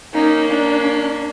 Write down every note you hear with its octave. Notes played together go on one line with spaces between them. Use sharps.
A#3 C#4 D#4
D4